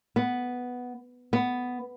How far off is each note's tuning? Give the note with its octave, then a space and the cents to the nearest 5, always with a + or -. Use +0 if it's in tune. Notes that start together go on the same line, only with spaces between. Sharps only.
B3 +0
B3 +5